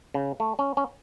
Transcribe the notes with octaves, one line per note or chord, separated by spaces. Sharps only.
C#3
A3
C#4
C#4